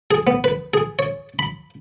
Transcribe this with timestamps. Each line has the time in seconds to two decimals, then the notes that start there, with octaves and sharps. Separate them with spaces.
0.11 G#4
0.27 B3
0.44 B4
0.74 G#4
0.99 C#5
1.39 B5